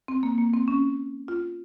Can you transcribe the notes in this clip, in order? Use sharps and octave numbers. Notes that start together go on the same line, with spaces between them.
C4
A#3
A#3
C4
C#4
F4